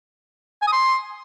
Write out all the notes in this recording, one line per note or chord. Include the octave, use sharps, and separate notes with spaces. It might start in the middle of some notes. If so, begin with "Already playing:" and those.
G#5
D#6
C6